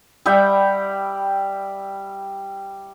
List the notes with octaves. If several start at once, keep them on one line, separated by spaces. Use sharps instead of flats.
G3 E5 F#5 G5